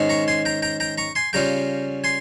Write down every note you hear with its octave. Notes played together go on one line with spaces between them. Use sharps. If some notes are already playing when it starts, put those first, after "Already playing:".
Already playing: G#2 D#3 G#3 C#4
A#5 C#6
G#5 C6
G5 A#5
G5 A#5
G5 A#5
A#5 C#6
G#5 C6
C#3 G3 C#4 F4 G5 A#5
G#5 C6